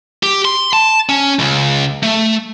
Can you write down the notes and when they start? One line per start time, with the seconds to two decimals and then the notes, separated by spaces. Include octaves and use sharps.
0.23 G4
0.45 C6
0.73 A5
1.09 C#4
1.39 C#2
2.03 A3